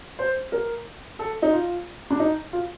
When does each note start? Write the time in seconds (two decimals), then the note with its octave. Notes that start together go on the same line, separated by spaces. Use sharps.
0.19 C5
0.52 A#4
1.19 A4
1.42 D#4
1.53 F4
2.10 D4
2.20 D#4
2.53 F4